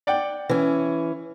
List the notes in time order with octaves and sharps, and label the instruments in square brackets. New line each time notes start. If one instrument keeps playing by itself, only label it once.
[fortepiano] D5 F#5 G5
[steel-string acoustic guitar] E3 C#4